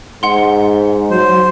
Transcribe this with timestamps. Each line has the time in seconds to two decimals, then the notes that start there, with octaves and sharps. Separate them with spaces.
0.23 G#2 F#5 C6
1.11 F#3 C5